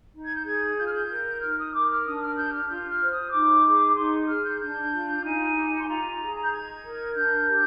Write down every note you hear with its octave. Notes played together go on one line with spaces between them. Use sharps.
D#4
G#6
G6
G#4 G#6
F4 G6
F6
G6
A#4
D#4 F6
D#6
A#4 D6
F6
D4 D#6
F6
G4 G6
F6
F4 G6
F6
C5
D#6
D#4 D6
G#4
D#4 C6
G#4 F6
G6
D4 G6
F4
D#4 G#5
G4
C6
F4 A#5
G#4
G6
D#4 G#6
A#4
D4 G6
G4